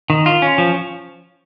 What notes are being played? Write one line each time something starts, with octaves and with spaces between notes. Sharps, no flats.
D#3
F4
C#4
F3